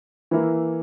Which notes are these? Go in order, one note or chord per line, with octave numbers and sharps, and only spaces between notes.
E3 A#3 E4 A#4